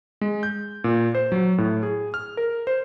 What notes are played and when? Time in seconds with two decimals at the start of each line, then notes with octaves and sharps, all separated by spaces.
0.21 G#3
0.43 G6
0.84 A#2
1.15 C5
1.32 F#3
1.58 A2
1.83 G#4
2.14 F6
2.37 A#4
2.67 C5